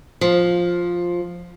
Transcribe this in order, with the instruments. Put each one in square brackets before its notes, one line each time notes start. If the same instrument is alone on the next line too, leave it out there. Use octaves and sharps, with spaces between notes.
[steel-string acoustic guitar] F3